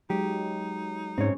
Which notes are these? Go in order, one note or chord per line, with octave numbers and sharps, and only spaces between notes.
F#3 G#3 D#4 G4
G#2 C4 C#4 C#5